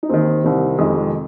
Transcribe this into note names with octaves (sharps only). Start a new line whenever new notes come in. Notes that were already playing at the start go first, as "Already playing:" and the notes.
D#4
D#2 D#3 C4
C2 C3 D#3
F2 C3 D#3 G#3
G#3